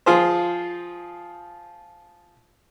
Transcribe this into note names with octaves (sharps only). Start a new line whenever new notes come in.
F3 F4 G#4 C5